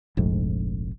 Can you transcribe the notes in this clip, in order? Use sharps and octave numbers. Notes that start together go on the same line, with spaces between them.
F1 A#1 F2 G#2